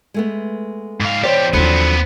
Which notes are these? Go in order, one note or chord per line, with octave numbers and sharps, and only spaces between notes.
G#3 A3 B3
G#2 F5
E2 G4 C5 D5
D#2 D3 F3 F#3 B3 C4 D#4